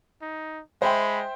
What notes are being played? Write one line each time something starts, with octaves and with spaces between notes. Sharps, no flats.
D#4
G#3 C5 E5 G5 B5